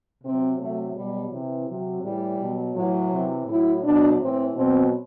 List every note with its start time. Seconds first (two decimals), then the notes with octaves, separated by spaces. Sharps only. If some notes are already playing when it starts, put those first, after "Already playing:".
0.23 C3 F#3 C4
0.59 C3 F#3 A3
0.95 B2 F#3 G3
1.31 C3 E3
1.67 C3 F#3
2.02 A2 E3 G3
2.39 B2 F#3
2.74 A2 E3 F#3
3.11 C3 E3
3.47 A2 F#3 E4
3.83 B2 F#3 D4
4.18 A2 E3 C4
4.55 B2 F#3 C4